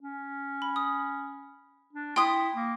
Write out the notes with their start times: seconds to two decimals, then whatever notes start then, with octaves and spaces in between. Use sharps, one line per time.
0.01 C#4
0.62 B5
0.76 D#6
1.93 D4
2.16 E4 G5 C6 D#6
2.55 A#3